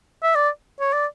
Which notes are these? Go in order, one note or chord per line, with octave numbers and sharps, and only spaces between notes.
E5
D5
C#5
D5